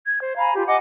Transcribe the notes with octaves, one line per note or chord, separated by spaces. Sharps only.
G#6
C5
F5 G#5 A#5 B5
F4 G4
D#5 F#5 G#5 D6